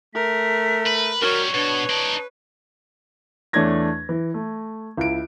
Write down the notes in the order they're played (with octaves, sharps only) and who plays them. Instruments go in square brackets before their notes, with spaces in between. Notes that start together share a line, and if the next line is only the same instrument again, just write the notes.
[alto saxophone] A3 [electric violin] A#4 [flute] B6
[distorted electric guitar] B4
[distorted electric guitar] F#3 G3 [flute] F#4 [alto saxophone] A#4 [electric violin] C#5
[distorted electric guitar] B2 [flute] D4 [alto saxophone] B4
[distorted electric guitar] D#4 D5 [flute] A5
[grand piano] E2 A3 D4 C#5 G#6 A#6
E3
A3
C#2 E4 D7